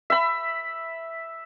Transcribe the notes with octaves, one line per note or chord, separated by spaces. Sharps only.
E5 B5